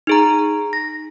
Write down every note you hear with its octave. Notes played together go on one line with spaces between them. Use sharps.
D#4 G#4 A#5
A#6